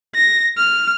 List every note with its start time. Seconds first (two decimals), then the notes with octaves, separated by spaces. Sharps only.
0.15 A#6
0.58 F6